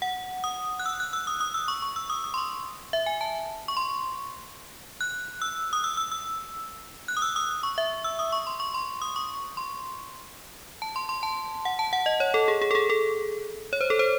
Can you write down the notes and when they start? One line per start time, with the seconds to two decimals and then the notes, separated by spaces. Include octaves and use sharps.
0.02 F#5
0.44 D#6
0.80 F#6
0.86 E6
1.00 F#6
1.13 E6
1.27 D#6
1.41 D#6
1.54 E6
1.68 C#6
1.82 C#6
1.96 E6
2.10 D#6
2.24 D#6
2.34 C6
2.38 C#6
2.93 E5
3.06 G#5
3.21 A5
3.68 C#6
3.77 C6
5.01 F#6
5.42 E6
5.73 D#6
5.84 E6
5.97 E6
6.12 E6
7.08 F#6
7.17 D#6
7.22 E6
7.36 D#6
7.63 C#6
7.78 E5
8.04 E6
8.19 D#6
8.32 C#6
8.47 C6
8.60 C#6
8.74 C6
9.02 D#6
9.16 C#6
9.57 C6
10.82 A5
10.96 C6
11.09 C6
11.23 A5
11.65 F#5
11.79 A5
11.93 F#5
12.06 D#5
12.20 C#5
12.34 A4
12.48 G#4
12.62 G#4
12.71 A4
12.75 G#4
12.90 A4
13.73 C#5
13.81 C5
13.90 A4
13.99 C5